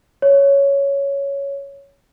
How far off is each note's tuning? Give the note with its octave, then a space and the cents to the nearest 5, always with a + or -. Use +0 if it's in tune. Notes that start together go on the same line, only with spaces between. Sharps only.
C#5 +5